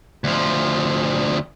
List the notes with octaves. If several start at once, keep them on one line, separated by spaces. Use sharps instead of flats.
D2 F3